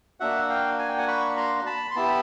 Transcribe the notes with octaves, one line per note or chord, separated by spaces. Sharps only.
A#3 D4 F#4 E5 F#5
F5 G5
G#5
G5
F#5 G#5
B5 C#6
A#5 C6
A5 B5
C6
B3 E4 G4 A5 B5